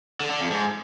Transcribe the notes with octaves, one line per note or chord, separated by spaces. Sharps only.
D3
D3
F2
G#2